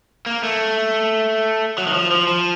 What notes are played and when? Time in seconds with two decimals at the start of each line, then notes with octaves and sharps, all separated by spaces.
0.26 A#3
0.43 A3
1.78 F#3
1.87 D#3
1.94 F3
2.11 F3
2.27 F3